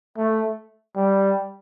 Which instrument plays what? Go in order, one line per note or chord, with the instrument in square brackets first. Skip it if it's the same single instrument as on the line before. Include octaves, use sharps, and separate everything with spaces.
[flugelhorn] A3
G3